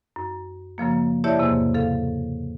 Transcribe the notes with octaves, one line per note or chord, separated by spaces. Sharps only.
F#2
F#2 C#3 F3 A#3
E4 G4 C#5 D5 E5 A5
E2 G#2 C3 A#3
C#3 A4 F5